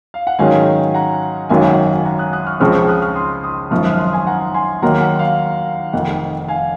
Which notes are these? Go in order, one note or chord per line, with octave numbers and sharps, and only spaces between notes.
F5
F#5
G#2 D#3 F#3 C#4 F5 G#5
F#5 A#5
G#1 F#2 D#3 F#3 F5 G#5
F#5
F#5 A#5
D#6 F#6
D#6 F#6
C#6 F6
C#2 C#3 F3 C4 C#6 F6
C#6 F6
D#6 F#6
C#6 F6
C6 D#6
C6 D#6
G#1 F#2 F3 C#6 F6
D#6 F#6
F6
C6 D#6
G#5 C6
F#5 A#5
G#5 C6
D#2 D#3 F#3 A#3 F#5 A#5
F#5
F5
F1 F2 D#3 F#5
F5 G#5